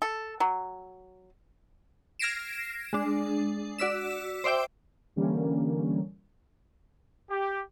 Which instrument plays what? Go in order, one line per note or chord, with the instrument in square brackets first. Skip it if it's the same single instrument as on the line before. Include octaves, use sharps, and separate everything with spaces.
[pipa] A4
F#3
[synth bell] F6 G#6 A#6 C7 D7 E7
G#3 D4
F#4 D5 E6 B6 E7
C5 D5 E5 G5 D6
[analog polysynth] D3 E3 G3 A#3 C#4
[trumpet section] G4